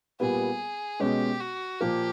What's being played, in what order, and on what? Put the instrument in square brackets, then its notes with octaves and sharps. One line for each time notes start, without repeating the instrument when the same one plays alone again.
[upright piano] A#2 G3 B3 [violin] G#4
[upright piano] B2 G#3 C#4 [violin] G4
[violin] F#4
[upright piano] A#2 F3 A#3 [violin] G4